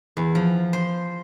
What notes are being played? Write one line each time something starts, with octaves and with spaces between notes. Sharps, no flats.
E2
F3
C5